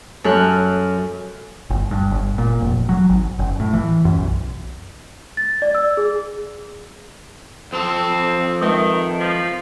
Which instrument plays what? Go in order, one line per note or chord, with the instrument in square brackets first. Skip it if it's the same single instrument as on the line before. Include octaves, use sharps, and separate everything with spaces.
[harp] F#2 A4 F6 F#6
[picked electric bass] G1
G2
G1
A#2
F1
F#3
G#1
F#1
A2
E3
F#2
B1
[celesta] A6
D5
E6
G#4
[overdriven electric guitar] F2 A4 [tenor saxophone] C4
[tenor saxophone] D#3 [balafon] G#3 B4 E5
[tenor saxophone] F3